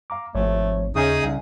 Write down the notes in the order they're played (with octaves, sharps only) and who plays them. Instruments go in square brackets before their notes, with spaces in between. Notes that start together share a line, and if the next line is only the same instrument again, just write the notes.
[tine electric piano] F5 A#5 D6
[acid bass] G#1 [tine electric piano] F3 C5 C#5 [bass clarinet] A3
[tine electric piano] D#2 E5 G6 [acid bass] C#3 [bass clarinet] C#4 [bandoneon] D#4 G#4 D#6
[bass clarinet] C2 [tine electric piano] E5 G#5